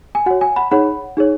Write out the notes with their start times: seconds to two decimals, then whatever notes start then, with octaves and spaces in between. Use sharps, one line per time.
0.15 G#5
0.26 F#4 F#5
0.30 C#5
0.41 G#5
0.56 F#5 B5
0.71 D#4 G#4 C#5 F#5 B5
1.17 D#4 G#4 C#5